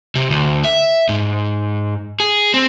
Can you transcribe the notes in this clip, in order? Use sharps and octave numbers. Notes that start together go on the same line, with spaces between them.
C3
D2
E5
G#2
G#4
C4